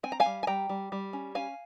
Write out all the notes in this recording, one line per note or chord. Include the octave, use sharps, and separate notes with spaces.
C4 G#5
A#5
F5 G#5
G3
G#5
G3 G5 A#5
G3
G3
C#4
C#4 F5 G#5